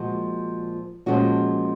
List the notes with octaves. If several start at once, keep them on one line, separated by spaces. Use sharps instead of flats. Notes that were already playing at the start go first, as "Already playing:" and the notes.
Already playing: A#2 F3 G#3 F#4
A#2 F3 G#3 C#4 F#4